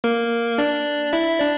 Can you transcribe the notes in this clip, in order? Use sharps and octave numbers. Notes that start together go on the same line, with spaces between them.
A#3 A#4
D4 D5
E4 E5
D4 D5